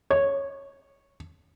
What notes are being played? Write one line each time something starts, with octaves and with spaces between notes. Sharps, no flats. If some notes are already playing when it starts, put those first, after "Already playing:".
C#5